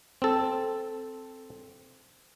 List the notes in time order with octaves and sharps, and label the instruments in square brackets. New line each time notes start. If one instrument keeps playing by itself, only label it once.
[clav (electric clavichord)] C4 A4